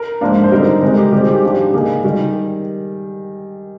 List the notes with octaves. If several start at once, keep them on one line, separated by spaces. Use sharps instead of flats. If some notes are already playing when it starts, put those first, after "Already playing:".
Already playing: A#4
G#2 F3 A#3 D4
C5
D3 G3 C4 D#4 A#4
C3 D#3 G#3 D#4 A#4
G4
D#3 G3 C4 G4
G#4
G4
G#2 F3 G#3 D4 G4
D#3 A#3 D#4 G#4
D#3 G3